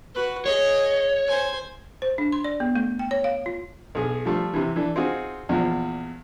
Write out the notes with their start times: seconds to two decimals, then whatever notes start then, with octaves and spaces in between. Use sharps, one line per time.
0.15 F#4 B4
0.46 G#4 C#5 D#5
1.28 C5 G#5
2.02 C5
2.18 D4
2.32 C6
2.44 D5
2.60 B3
2.75 A3
2.99 G5
3.11 C#5
3.24 F5
3.46 F4
3.95 B1 G#4
4.25 F3 G3 A3 F4
4.53 C3 E3
4.76 E3 D4 A4
4.96 C4 D#4 F4 F#4 G#4
5.49 E2 A#2 F3